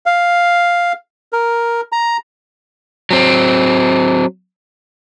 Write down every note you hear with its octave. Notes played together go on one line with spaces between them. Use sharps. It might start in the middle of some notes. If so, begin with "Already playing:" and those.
F5
A#4
A#5
F#3 C4